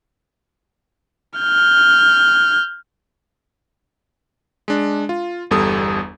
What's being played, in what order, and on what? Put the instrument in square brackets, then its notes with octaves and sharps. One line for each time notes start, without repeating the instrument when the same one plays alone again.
[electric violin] F6 G6
[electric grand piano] G#3 D4
F4
G1 E2 G3 A4 D#6